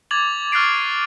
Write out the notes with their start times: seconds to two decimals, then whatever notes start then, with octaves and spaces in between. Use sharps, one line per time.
0.11 D6 G#6 A6 F7 F#7
0.52 C#6 F6 F#6 A6 C7 D7